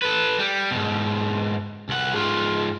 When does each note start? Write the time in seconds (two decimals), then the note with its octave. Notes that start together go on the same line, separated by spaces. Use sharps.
0.02 A4 B4
0.39 G3
0.71 G#2 B2
1.89 C2 F#5
2.15 G#2 F4